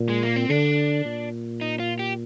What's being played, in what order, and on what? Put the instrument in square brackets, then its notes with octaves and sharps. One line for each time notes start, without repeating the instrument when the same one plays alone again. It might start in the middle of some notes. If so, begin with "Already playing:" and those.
Already playing: [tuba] A#2
[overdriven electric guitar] G#3
A#3
C4
[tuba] D3 [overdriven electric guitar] D4
[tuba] A#2
[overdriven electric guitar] D#4
F4
G4